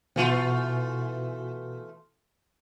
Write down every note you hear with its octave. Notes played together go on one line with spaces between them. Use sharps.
B2 E3 A3 F4 F#4